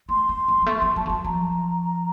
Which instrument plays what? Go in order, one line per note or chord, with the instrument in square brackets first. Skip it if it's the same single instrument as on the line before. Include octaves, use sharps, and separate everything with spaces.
[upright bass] A3 [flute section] C6
[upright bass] A3
F#3
F#3
[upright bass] A3 [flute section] C#6
[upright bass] F#3 [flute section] C6
[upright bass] F#3 [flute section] A5
[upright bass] F3
[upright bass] F#3 [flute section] A5
[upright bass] F3 [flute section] A#5